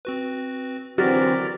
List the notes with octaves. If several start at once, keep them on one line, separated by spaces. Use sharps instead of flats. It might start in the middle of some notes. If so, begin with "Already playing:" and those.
C4 F#4 B4
D3 E3 F#3 C4 F#4 A#4 D5 B6